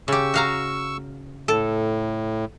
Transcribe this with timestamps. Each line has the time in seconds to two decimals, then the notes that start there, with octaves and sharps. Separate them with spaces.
0.08 C#3 G4 C#6 E6
0.34 F#4 F5 A#5
1.48 A2 A4